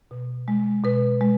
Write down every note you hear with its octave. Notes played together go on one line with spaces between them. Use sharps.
B2
G#3
B2 B4
G#3